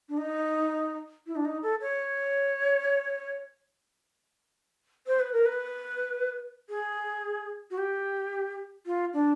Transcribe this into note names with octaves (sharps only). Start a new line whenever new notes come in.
D4
D#4
E4
D4
D#4
A4
C#5
C5
B4
A#4
B4
G#4
F#4
G4
F4
D4